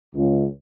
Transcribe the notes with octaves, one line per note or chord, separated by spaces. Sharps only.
C#2